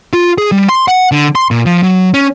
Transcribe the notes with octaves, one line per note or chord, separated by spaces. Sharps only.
F4
G#4
G3
C6
F#5
D3
C6
A#2
F3
F#3
C#4